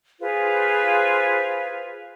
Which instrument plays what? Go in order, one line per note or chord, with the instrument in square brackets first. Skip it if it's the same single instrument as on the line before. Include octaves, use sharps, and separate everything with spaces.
[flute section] F4 G#4 B4 C5